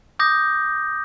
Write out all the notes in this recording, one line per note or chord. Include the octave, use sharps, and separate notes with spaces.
D6 D#6 G6 A#6